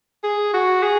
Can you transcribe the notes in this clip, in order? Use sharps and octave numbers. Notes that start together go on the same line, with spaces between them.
G#4
F#4
G#4